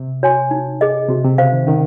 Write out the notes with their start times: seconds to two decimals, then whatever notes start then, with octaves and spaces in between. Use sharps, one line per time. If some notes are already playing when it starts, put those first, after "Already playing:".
Already playing: C3
0.23 F#4 C#5 G#5 C6
0.51 D#4
0.81 G#4 D#5
1.09 C3 F#4
1.24 C3
1.38 C#3 C5 F5
1.52 D#3
1.67 D#3 C#4